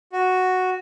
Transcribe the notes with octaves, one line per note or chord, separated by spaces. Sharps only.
F#4